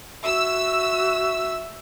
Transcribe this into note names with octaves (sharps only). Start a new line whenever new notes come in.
F#4 E5 E6